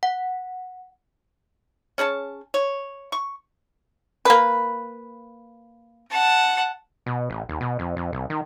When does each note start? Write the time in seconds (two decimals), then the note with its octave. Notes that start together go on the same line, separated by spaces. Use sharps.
0.03 F#5
1.98 C#4 G#4 C#5 A5
2.54 C#5
3.12 C#6
4.25 A#3 B4
6.10 F#5 A5
7.06 B2
7.30 A1
7.49 D#2
7.61 B2
7.79 F2
7.96 F2
8.13 C2
8.30 D#3